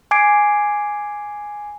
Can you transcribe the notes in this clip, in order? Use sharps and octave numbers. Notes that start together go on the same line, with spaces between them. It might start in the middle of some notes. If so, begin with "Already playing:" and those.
G#5 D6 G#6 C7 D7